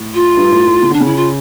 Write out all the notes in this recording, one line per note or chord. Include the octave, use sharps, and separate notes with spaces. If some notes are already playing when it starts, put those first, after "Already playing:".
Already playing: A2
F4
G2
A2
A2
C#3
D3 D4
C#3 E4
F4